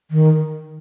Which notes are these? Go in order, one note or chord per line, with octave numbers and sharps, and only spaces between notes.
D#3